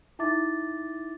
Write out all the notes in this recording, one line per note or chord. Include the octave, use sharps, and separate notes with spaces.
D#4 E4 E5 D6 A6